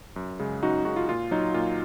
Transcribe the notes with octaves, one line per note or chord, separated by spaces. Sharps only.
F#2
C#3 G#3
F#2 D#4 F#4
C#3 G#3 D#4 F#4
F4
A#2 F4
F#3 D#4
A#2 F4